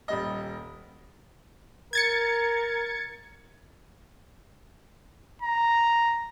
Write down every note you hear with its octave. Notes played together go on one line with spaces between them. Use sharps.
D#1 G3 D#5
A#4 G#6 A6 C#7
A#5